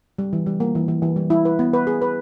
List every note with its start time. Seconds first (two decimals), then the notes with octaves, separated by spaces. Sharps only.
0.19 G3
0.33 E3
0.46 G3
0.60 A#3
0.75 E3
0.88 E3
1.02 E3
1.16 G3
1.30 E4
1.45 B4
1.59 B3
1.73 B4
1.87 G#4
2.02 B4